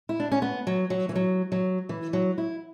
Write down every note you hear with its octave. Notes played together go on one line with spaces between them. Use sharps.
E4
D4
C#4
B3
F#3
F#3
E3
F#3
F#3
E3
F#3
E4